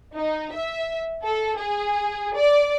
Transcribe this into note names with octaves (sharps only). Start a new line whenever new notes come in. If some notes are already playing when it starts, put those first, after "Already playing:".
D#4
E5
A4
G#4
D5